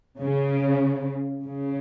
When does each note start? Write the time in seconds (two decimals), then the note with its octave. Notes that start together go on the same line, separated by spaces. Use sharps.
0.21 C#3
1.46 C#3